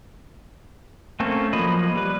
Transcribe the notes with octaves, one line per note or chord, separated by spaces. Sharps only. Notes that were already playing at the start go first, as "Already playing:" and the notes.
A3 A#3 C4 C#4 A4
F3 F#3 A#3 D#5 B5
G3 B4